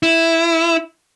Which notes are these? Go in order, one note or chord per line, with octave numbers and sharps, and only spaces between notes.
E4